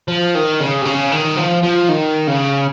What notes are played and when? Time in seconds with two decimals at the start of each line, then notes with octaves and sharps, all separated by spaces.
0.08 F3
0.35 D#3
0.60 C#3
0.82 C3
0.85 C#3
1.12 D#3
1.37 F3
1.63 F3
1.89 D#3
2.27 C#3